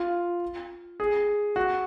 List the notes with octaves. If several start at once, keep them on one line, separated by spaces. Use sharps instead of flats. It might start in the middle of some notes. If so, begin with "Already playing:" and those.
Already playing: F4
G#4
F#4